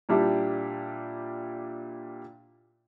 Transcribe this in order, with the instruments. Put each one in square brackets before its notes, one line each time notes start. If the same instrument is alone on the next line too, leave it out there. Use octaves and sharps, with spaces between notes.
[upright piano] A#2 G3 D4 E4 G4